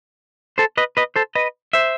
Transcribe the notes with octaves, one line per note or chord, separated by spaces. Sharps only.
A4 C5
B4 D#5
B4 D#5
A4 C5
B4 D#5
C5 E5